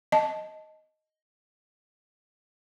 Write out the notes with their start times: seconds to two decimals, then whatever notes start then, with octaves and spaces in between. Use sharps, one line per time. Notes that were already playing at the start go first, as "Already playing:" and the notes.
0.12 D#5 A5